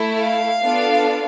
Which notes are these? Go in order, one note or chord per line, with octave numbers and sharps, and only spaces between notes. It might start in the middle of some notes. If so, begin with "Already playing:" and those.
Already playing: A3 E4 A4
F5
B3 D4 F4 A4